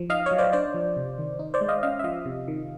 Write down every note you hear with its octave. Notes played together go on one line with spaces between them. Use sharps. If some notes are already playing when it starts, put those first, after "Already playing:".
Already playing: F3
D#4 D#5 F5
C#5
F#3
C5 D5
D4 C5 D5
F3
C3
D#3
D#4
C5 D5
G#3
D#5 F5
C#4 D#5 F5
E5
F3 D#5 F5
C3
D#3